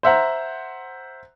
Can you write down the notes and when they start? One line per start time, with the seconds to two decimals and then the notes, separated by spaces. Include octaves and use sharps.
0.03 C5 E5 F#5 A#5